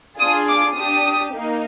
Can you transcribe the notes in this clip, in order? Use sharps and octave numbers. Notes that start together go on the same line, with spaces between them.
D4 F4 G#4 D#6
D6
D4 G4 D#6
A#3 D#4